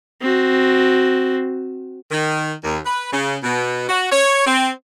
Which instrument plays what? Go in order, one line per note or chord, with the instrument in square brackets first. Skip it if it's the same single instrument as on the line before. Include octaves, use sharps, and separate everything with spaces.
[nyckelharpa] C4 F#4
[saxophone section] D#3
D#2
B4
C#3
B2
F#4
C#5
C4